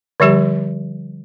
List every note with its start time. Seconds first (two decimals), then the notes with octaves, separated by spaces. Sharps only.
0.20 D3 F3 G3 G4